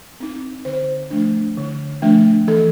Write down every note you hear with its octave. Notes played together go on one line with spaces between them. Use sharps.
C4 D#4
D3 C5
F3 A3 D4
D3
F3 A3 D4
E3 A4